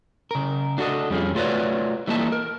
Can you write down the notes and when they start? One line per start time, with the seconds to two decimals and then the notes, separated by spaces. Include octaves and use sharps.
0.31 C#3 A#4
0.78 D4 F#4 A4 D5 D#5
1.10 F2 G3 C#4 F4 G#4
1.35 A3 F4 F#4 B4 C#5 D5
2.08 E3 G3 A3 A#3 D#5 A5
2.32 A#4